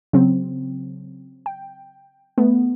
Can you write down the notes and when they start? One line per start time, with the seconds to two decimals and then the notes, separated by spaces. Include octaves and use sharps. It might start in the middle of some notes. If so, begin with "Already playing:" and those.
0.13 C#3 F#3 C4
1.46 G5
2.38 A3 B3